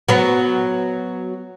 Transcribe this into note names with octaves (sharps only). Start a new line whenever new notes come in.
F#3 B3